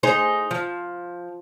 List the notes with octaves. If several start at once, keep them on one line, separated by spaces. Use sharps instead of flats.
D#4 G#4 C5
F3